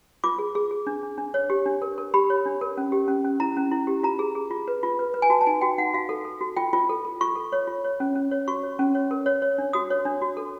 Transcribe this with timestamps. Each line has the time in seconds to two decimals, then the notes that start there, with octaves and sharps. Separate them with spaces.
0.24 F4 D6
0.39 G#4
0.55 G#4
0.71 G#4
0.87 D4
1.03 D4
1.18 D4
1.34 C#5
1.50 G4
1.66 D4
1.82 A#4
1.98 A#4
2.14 G4 B5
2.30 C#5
2.46 D4
2.61 A#4
2.77 C#4
2.92 G4
3.08 C#4
3.24 C#4
3.40 E4 A#5
3.57 C#4
3.72 E4
3.87 G4
4.03 F4 A#5
4.19 G#4
4.35 G#4
4.51 F4
4.68 B4
4.83 F4
4.99 B4
5.14 B4
5.22 G#5
5.30 F#4 A5
5.41 A5
5.46 D#4 G#5
5.61 F#4 G5
5.78 D#4 F#5
5.94 F#4 F5
6.09 A4
6.25 A4
6.41 F#4
6.57 F4 G5
6.73 F4
6.89 A4
7.05 A4
7.21 F4 C#6
7.36 A4
7.52 C#5
7.67 F4
7.84 C#5
8.00 C#4
8.15 C#4
8.31 C#5
8.48 F#4 C#6
8.63 C#5
8.79 C#4
8.95 C#5
9.11 A#4
9.26 C#5
9.42 C#5
9.58 D4
9.73 F#4 D#6
9.90 C#5
10.05 D4
10.22 F#4
10.37 A4